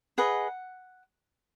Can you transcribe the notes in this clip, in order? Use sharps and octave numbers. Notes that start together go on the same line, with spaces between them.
G#4 B4 D#5 F#5